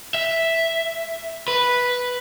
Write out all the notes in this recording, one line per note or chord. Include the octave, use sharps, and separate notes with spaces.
E5
B4